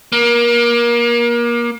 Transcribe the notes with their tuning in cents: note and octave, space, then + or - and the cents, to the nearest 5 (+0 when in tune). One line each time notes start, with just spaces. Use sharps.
A#3 +30